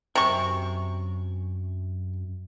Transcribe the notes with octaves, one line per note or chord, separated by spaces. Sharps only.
F#2 C3 G#5 C#6